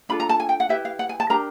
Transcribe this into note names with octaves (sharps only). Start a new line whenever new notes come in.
D4 F4 A4 B5
A#5
A5
G#5
G5
F#5
E4 G4 B4 E5
F5
F#5
G#5
A5
D4 G4 A#4 A#5